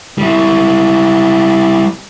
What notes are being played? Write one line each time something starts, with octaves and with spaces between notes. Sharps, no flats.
G3 E4